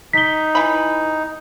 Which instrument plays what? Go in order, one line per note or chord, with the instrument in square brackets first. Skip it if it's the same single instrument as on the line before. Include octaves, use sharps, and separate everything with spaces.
[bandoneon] D#4 [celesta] B6 G7
[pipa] E3 B5